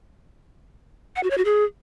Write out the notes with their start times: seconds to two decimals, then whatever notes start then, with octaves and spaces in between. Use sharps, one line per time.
1.16 F#5
1.23 F#4
1.30 C#5
1.38 F#4
1.45 G#4